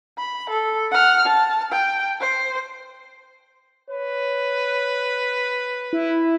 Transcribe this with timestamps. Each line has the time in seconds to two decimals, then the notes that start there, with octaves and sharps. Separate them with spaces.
0.18 B5
0.50 A4
0.91 F#5 F6
1.25 A5
1.72 G5
2.21 C5
3.90 B4 C#5
5.93 E4